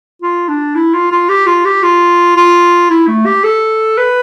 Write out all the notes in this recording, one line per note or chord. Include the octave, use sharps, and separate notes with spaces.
F4
D4
E4
F4
F4
G4
F4
G4
F4
F4
E4
A3
G4
A4
B4